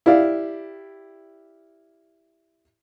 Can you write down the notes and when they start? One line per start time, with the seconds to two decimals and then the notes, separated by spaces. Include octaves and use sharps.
0.06 E4 G4 D5 F5